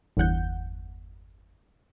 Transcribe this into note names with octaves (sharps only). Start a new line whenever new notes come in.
G1 E2 F#5 G6